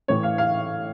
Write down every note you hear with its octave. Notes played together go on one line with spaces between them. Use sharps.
A2 E3 C#5
F5
F5